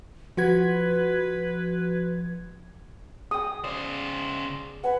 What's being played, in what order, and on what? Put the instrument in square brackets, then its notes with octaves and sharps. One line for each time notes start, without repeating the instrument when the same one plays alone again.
[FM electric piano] F3 F#4 G#6 [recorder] B4
[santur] G#4 G5 [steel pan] D#6
[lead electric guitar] C#3 C5 [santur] D5
[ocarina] B4 [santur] F#5 G#5